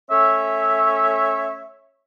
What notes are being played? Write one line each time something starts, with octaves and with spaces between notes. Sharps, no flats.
A3 C#4 C#5 E5